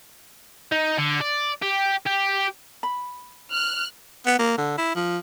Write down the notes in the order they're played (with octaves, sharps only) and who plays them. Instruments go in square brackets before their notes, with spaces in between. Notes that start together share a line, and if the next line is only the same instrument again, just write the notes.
[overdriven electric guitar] D#4
D3
D5
G4
G4
[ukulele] B5
[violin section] F6 F#6
[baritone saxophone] B3
A#3
D3
E4
F3